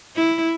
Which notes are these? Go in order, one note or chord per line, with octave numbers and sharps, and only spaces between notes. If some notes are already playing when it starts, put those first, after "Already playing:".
E4